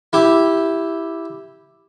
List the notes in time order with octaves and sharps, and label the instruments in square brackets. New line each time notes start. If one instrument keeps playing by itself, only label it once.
[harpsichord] E4 G4